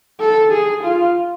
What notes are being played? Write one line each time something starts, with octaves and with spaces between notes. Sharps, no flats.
A4
G#4
F4